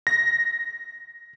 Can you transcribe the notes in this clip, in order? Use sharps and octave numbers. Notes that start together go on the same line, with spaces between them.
A#6